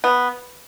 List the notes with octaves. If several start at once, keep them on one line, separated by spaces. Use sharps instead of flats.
B3